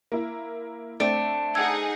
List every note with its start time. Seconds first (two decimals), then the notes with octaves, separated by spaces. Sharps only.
0.12 A#3 E4
1.00 A3 C4 D4 D5
1.55 D#4 G#4 F#5 E6 G#6